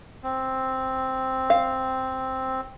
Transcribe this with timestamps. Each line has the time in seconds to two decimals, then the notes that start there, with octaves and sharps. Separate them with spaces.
0.23 C4
1.50 F5